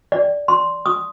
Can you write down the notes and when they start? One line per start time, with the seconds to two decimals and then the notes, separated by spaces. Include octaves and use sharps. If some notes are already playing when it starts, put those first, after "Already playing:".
0.12 D5
0.48 C6
0.86 D#6